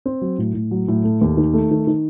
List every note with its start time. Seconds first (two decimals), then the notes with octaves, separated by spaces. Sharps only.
0.06 C4
0.22 F#3
0.38 A2
0.54 A2
0.71 F#3
0.88 A2
1.04 A3
1.21 D#2
1.37 D#3
1.53 A3
1.71 D#3
1.87 D#3